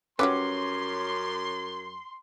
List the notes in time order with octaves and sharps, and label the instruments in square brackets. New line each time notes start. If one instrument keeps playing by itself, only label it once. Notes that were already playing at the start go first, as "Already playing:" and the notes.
[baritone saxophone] F#2 [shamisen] F#3 G3 B4 [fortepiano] C#4 D6 [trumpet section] C6